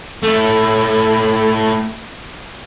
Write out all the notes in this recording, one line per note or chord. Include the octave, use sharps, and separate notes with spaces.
A3 E4